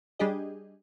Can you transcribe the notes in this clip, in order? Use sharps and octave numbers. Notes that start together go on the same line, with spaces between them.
G3 D4 G4 G#4 D#5